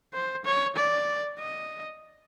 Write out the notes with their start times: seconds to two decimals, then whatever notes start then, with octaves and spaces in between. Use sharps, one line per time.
0.14 C5
0.45 C#5
0.76 D5
1.39 D#5